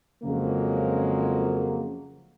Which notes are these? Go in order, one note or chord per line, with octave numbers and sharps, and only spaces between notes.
F2 C#3 F3 F#3 G#3 A#3